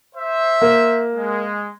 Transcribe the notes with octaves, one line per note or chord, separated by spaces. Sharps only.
C5 E5
A#3
G#3